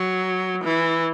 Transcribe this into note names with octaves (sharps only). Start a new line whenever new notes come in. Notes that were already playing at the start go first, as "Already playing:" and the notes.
Already playing: F#3
E3